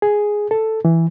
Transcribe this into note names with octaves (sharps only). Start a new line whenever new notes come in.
G#4
A4
E3